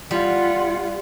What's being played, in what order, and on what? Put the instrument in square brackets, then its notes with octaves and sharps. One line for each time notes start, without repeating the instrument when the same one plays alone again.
[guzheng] G3 [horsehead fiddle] F4 F#5